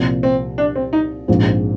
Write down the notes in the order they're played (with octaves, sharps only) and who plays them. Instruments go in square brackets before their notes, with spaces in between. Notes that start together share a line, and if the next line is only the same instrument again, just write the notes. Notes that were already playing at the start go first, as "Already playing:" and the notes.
Already playing: [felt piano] C2 A#2 F3
[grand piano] C4
D4
C4
D#4
[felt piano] A#1 G#2 F3 C4